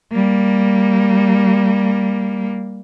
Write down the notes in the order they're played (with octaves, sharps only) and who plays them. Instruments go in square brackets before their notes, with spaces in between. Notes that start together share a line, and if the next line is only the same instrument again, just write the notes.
[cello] G3 A#3